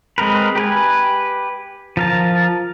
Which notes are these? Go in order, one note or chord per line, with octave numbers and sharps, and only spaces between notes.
G#3 C4 A#4 B4
G4 B4 G#5
F3 A#4 A5